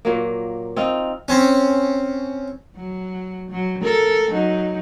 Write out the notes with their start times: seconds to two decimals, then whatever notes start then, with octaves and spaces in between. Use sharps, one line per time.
0.05 A#2 F#3 A#3
0.76 C4 D#4 F4
1.28 C4 C#4
2.76 F#3
3.51 F#3
3.83 A4 A#4
4.31 F#3 D#4